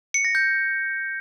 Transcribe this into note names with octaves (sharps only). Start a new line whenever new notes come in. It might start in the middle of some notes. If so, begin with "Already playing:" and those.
C#7
A#6
G6